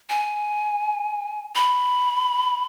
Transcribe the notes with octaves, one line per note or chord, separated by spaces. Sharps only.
G#5
B5